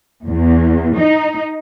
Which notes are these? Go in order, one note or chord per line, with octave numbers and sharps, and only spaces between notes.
E2
D#4